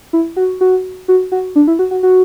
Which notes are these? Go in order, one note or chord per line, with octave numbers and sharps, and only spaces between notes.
E4
F#4
F#4
F#4
F#4
D4
E4
F#4
F#4
F#4